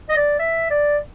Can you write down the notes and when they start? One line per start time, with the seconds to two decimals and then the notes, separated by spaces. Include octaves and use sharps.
0.09 D#5
0.16 D5
0.39 E5
0.70 D5